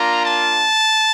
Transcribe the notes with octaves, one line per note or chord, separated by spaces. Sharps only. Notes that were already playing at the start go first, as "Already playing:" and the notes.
Already playing: A#3 D4 F4 A#5
A5